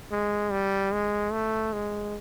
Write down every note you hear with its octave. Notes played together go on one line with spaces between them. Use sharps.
G#3
G3
G#3
A3
G#3